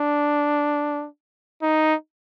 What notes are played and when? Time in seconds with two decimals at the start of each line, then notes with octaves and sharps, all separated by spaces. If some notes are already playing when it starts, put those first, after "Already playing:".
Already playing: D4
1.62 D#4